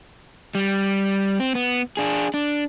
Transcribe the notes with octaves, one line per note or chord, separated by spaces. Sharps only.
G3
C4
B3
D4 G#4
D4